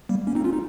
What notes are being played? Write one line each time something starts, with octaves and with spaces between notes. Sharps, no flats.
G3 A#3
A#3 C#4
C4 D#4
C#4 F4
D#4